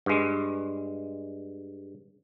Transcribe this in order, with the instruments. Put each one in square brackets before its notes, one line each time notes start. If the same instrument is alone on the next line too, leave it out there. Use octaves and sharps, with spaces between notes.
[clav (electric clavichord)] G2 G#3